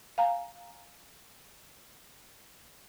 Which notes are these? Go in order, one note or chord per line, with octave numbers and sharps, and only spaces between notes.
F5 G#5 A#5